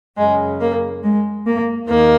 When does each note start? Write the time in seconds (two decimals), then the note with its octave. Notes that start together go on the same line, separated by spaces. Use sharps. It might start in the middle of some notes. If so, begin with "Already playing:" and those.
0.17 F#2 C#3 G#3
0.60 A#3
1.03 G#3
1.45 A#3
1.87 D#2 D#3 A#3